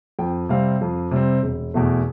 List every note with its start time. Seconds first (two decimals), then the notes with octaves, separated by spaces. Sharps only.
0.19 F2 G5
0.49 C3 G3 C4 F5
0.81 F2
1.11 C3 G3 C4
1.43 E1
1.74 E2 B2 A3